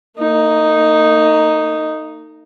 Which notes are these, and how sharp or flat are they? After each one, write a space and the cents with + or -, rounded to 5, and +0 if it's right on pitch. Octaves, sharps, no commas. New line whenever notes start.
A#3 -45 D#4 +0